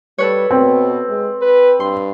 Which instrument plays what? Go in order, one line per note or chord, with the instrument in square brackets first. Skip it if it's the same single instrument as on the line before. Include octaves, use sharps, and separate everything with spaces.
[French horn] G3 [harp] A4 B4 C#5
[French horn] B2 [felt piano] C4
[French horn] G#3
B4
[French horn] G2 [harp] C6